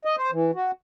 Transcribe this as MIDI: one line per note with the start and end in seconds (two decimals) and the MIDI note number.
0.05 0.16 75
0.18 0.31 72
0.32 0.51 52
0.55 0.71 66